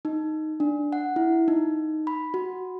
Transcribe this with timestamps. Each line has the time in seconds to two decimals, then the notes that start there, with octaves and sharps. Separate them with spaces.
0.05 D#4
0.60 D4
0.92 F#5
1.16 E4
1.48 D#4
2.07 B5
2.34 F#4